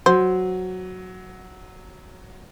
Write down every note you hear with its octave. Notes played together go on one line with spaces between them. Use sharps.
F#3 C5